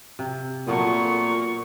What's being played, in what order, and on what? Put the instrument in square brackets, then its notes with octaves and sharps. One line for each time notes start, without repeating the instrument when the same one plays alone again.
[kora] C3
[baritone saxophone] A#2 [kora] F#3 A3 B3 [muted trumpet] C#6